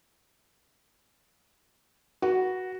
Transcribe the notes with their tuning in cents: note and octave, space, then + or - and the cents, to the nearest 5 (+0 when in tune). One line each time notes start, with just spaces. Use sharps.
F#4 +0 B4 -30